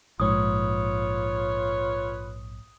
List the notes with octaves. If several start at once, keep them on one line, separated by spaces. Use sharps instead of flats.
A#1 G#2 F4 B4 C#5 D#6